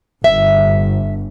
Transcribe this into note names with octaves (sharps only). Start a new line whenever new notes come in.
G1 E5